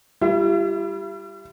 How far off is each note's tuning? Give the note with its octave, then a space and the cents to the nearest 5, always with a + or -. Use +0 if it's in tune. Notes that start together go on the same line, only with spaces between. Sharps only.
G3 +0 F4 -45 E5 +45